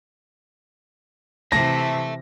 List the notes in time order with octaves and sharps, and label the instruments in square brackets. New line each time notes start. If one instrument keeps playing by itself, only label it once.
[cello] C3 E3 [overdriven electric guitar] E5 A5 [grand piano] A#6